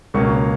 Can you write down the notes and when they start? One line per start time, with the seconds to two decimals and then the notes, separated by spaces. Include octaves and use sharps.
0.14 C#2 B2 A#3 C#4 C#6